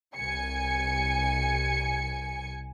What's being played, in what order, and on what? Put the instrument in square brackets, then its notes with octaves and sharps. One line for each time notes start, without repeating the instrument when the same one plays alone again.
[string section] C2 G#5 C#7